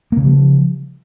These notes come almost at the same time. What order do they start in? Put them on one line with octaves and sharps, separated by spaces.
A#3 C#3 G3 F3